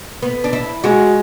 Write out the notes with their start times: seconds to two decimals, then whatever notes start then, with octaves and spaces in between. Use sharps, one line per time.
0.22 B3
0.44 D4
0.53 E4
0.84 G#3 F#4